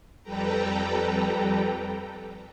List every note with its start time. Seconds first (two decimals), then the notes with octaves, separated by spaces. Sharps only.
0.23 F2 G3 A4 B4 G5 A#5